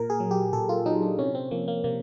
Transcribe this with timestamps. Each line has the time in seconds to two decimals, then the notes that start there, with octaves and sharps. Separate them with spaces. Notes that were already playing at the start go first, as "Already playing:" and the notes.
Already playing: A#2 A#4
0.10 G#4
0.20 F#3
0.31 G4
0.52 A#2 A4
0.69 F4
0.86 F#3 D#4
1.02 D4
1.18 C3 C#4
1.35 C4
1.51 F3 A#3
1.68 A#3
1.84 C3 A#3